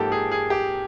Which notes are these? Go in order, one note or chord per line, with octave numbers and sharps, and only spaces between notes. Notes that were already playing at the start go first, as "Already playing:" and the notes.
Already playing: G#2 F3 A#3 G4 A4
G#4
G#4
G4